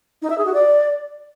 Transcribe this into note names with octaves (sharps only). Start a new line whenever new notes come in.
D#4
E5
G#4
F#4
D5